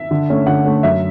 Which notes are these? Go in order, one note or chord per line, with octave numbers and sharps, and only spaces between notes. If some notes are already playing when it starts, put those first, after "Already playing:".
Already playing: E5
D3
A3 C#4
D3 F#5
A3 C#4
F#2 E5